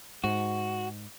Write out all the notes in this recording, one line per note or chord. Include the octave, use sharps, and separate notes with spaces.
G#2 F#4